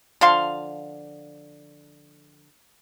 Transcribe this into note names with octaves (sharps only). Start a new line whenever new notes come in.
D3 F3 F5 C6